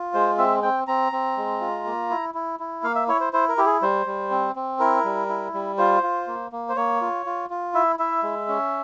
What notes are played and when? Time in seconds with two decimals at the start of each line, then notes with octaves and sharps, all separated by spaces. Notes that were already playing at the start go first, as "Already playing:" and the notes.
Already playing: F4
0.14 G#3 C5
0.38 C4 E5
0.63 C4 G5
0.87 C4 A#5
1.12 C4
1.37 G#3
1.61 F4
1.86 A#3
2.10 E4
2.35 E4
2.60 E4
2.83 A#3 F5
2.95 E5
3.08 E4 C#5
3.20 C5
3.33 E4 C5
3.49 A#4
3.57 E4 G4
3.66 G#4
3.82 G3 C5
4.06 G3
4.31 C4
4.56 C4
4.79 E4 A#4
5.05 G3
5.29 E4
5.54 G3
5.78 F4 C5
6.03 F4
6.27 A#3
6.52 A#3
6.69 C5
6.76 A#3 C#5
7.01 F4
7.26 F4
7.50 F4
7.74 E4 E5
7.99 E4 E5
8.23 G#3
8.48 C#4